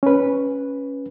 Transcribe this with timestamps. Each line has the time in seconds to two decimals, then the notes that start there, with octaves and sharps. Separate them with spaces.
0.03 C#4 B4